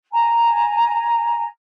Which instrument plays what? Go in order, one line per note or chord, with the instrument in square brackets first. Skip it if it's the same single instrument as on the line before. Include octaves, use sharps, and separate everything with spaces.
[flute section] G#5 A#5